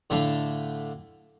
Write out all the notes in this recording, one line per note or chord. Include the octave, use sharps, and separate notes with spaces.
A2 D3 A3 D4 F5